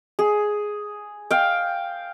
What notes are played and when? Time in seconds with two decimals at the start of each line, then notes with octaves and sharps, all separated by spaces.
0.19 G#4
1.31 F5 G5